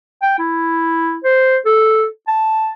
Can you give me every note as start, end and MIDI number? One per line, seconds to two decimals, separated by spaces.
0.22 0.35 79
0.39 1.17 64
1.24 1.57 72
1.65 2.05 69
2.28 2.72 81